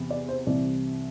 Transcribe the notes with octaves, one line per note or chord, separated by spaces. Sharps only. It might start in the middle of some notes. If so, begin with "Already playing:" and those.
Already playing: E2 C3 E3
D5
C5
C2 C3 E3 G3 D5